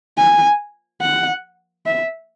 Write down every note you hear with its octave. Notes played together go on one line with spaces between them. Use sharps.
G#5
F#5
E5